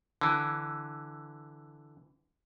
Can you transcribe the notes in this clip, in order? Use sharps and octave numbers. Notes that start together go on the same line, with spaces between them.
D3 E3